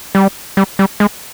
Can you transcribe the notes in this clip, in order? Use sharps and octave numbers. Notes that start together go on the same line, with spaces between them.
G3
G3
G3
G#3